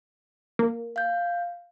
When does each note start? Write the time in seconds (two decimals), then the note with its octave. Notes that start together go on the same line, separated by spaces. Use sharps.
0.59 A#3
0.96 F5 G6